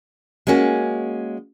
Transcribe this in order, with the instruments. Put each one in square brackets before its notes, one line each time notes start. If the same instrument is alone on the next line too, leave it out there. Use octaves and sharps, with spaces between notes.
[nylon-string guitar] G#3 A#3 C#4 F#4